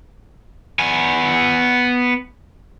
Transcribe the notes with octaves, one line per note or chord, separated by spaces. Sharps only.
B3 G#5